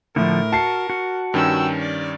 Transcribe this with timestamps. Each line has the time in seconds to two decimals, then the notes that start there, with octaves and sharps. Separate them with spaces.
0.16 A2 D3 F3 A#4
0.53 F#4 A5 C7
0.90 F#4
1.34 G2 D#3 C#4 G5 E6
1.80 D5